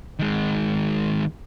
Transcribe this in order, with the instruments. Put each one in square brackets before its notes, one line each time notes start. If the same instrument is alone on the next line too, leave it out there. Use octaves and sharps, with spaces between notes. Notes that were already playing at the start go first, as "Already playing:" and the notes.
[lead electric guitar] D#3 G#3